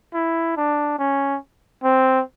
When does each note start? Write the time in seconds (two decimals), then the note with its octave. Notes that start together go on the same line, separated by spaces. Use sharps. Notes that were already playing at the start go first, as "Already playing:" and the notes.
0.14 E4
0.57 D4
0.98 C#4
1.84 C4